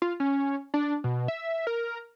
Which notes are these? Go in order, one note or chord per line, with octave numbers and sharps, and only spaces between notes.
F4
C#4
D4
B2
E5
A#4